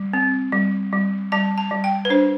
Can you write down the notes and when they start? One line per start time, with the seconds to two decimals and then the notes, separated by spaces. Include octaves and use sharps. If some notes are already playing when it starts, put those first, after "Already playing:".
Already playing: G3
0.13 C4
0.52 G3
0.93 G3
1.32 G3 A5
1.58 A5
1.71 G3
1.84 G5
2.05 B4
2.10 D4 C5